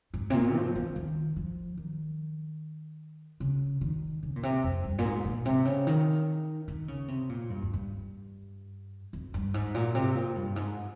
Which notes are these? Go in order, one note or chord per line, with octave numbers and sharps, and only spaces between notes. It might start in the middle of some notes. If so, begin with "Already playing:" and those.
G#2
C3
A#2
F3
D#3
D#3
F3
D#3
C#3
D#3
C#3
A#2
C3
F2
G2
A#2
G#2
A#2
C3
C#3
D#3
D#3
C#3
C3
A#2
G2
F2
G2
F2
G2
G#2
A#2
C3
A#2
G2
G#2